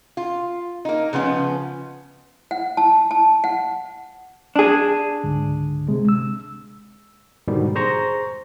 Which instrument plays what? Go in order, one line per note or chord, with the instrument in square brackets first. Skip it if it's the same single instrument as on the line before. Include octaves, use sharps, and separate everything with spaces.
[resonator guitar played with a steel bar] F4
A#3 D#4
C#3 F3 B3 C#4
[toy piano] F#5
A5
A5
F#5
[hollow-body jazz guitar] D4 G#4
[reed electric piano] C#2 G#2 D3
C3 G#3
E6
[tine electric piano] G#2 B2 D3 D#3 G3
G#4 C5 A#5 C#6 A#6